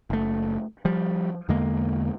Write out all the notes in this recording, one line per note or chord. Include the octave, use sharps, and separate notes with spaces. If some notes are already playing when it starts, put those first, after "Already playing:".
F#1 A3
F3 G3
E2 D3 G#3 A#3